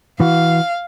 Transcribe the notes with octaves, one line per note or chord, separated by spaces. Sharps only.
E3 F#4 F5